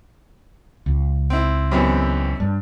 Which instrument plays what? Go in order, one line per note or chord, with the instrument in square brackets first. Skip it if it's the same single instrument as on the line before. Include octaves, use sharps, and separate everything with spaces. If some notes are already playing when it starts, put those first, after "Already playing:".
[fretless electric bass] C#2
[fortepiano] C4 E4
[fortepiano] F#2 B2 E3 [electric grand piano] C4 G4
[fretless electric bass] G2 [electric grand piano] D4